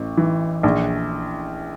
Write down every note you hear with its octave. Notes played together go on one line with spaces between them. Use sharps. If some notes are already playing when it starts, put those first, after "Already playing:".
Already playing: A1
E3
A#1